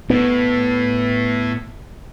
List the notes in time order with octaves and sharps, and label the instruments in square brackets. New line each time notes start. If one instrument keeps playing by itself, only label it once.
[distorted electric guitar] A2 [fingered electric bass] B3